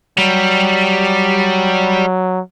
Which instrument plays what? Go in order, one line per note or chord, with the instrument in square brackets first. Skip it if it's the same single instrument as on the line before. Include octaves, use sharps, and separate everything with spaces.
[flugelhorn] F#3 [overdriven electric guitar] G3